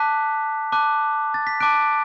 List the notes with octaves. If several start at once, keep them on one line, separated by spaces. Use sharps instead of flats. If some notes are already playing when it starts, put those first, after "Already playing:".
Already playing: A5 D6 F#6 B6
A5 D6 F#6
A6
B6
A5 D6 F#6 D7